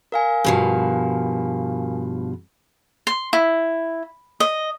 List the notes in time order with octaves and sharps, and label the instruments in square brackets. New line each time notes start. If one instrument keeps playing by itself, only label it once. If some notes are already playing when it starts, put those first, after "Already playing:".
[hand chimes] A#4 F5 G#5
[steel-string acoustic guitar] G2 B2 F3
[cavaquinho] C6
E4
D#5